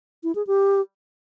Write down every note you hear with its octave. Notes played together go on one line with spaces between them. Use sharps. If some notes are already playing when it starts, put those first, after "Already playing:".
E4
G#4
G4